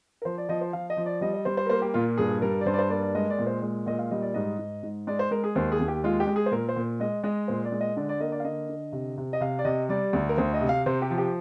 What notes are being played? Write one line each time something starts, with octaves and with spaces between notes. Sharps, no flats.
A#4
F3 C5
D5
F3 D#5
C5
F3 F5
D#5
F3
D5
G3 D#5
D#5
G3 C5
C5
A#4
A#3 C5
G4
A#2 F4
G2 G#4
G3 A#4
D5
G2 C5
D5
C5
A#3 D5
D5
G#3 D#5
D5
A#2
C5
G#3
A#2 D#5
F5
G3 D#5
D5
G#2 D#5
G#2
G#2
G#3 D5
C5
G#3 A#4
G#4
D#2 C5
G#4
D#2
G4
G#3 F4
G4
G#3
G#4
C5
A#2 A#4
C5
A#2
G#3 D#5
G#3 D#5
A#2 C5
D5
G#3
D#5
D3 D5
D5
A#3 D#5
D5
F5
D3 D#5
D3
C3
C3
D#5
C3 F5
D5
C3 D#5
G3 D5
D2
A#4
D2 C5
D#5
C3
F5
C3 C5
G4
F3
G4